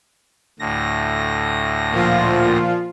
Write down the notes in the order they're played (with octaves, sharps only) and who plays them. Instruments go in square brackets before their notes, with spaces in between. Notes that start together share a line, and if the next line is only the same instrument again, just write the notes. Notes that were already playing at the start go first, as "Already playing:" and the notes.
[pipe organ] D2 A2 A#6
[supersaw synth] A#2 F3 F4